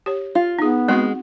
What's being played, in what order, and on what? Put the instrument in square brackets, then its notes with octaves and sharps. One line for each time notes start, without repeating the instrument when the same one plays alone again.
[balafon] G4 C#5
[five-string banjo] F4
[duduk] B3 [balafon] D#4 G#4
[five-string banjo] G#3 [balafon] C4 F#4 F#5